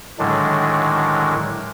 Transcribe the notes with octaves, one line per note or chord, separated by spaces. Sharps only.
A2 D3 D#3 F#3 G#3 D4